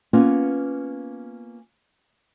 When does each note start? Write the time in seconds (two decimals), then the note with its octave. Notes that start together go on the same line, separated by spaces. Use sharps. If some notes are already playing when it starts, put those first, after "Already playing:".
0.13 A#3 B3 C#4 F4